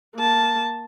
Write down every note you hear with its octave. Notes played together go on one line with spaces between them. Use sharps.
A#3 A5